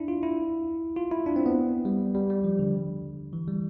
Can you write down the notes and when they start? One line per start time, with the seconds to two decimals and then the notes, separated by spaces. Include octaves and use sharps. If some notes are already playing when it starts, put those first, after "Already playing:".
Already playing: D4 E4
0.08 F4
0.23 E4
0.96 F4
1.12 E4
1.26 D4
1.36 C4
1.46 B3
1.85 G3
2.15 G3
2.30 G3
2.44 F3
2.59 D3
3.33 E3
3.48 G3